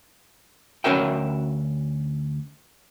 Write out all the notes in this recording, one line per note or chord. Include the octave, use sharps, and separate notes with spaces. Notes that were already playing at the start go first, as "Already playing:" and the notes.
D2 C#4 F#4 A#4 E5 G5